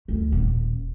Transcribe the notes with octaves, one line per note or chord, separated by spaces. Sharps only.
D2
D#1